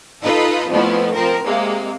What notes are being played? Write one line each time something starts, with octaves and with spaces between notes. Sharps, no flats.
D#4 F4 A4 B4 D#5
F2 F3 A3 B3 E4
F3 C4 A#4
C3 G#3 A#3